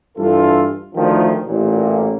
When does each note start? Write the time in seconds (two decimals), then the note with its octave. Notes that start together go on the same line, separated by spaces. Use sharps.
0.17 G2 E3 F4 A4
0.96 D2 D#3 F3
1.47 A1 A#2